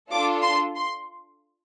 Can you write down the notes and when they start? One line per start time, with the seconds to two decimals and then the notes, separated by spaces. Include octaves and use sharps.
0.11 D4 F4 A4 D6
0.43 C6
0.76 C6